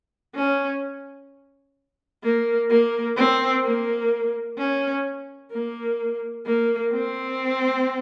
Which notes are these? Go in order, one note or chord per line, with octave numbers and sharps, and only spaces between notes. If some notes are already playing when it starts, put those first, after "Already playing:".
C#4
A#3
A#3
C4
A#3
C#4
A#3
A#3
C4